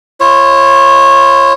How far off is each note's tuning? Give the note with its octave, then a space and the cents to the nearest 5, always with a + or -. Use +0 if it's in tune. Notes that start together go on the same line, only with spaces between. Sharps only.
F4 -40 C#5 -25